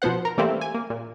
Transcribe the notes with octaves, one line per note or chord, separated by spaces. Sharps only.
B2 F3 B3 C5 F#5
A#4
E3 G3 A3 A#3 C4 E4
G#5
A#3
A#2